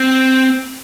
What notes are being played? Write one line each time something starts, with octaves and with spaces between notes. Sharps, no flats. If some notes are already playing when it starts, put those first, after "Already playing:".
Already playing: C4